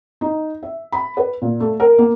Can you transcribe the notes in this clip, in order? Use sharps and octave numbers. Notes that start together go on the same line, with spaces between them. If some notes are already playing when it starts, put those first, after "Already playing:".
D#4
E5
B5
B4
A#2
A3
A#4
A#3